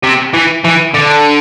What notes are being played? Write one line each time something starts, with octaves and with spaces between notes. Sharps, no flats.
C3
E3
E3
D3